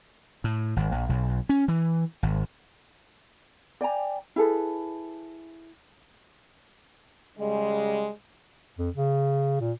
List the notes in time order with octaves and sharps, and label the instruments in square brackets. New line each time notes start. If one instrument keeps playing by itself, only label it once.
[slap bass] A2
G#1
A#1
B1
C#4
E3
G#1
[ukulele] D5 G5 G#5 A#5
E4 G#4 A4 B4
[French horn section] C#3 G3 G#3
[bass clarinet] F2
C#3
A#2